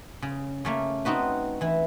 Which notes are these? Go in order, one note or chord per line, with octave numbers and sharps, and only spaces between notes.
C#3
C#3 A3 A#3
B3 C4 D#4 F#4 B4
E3 E4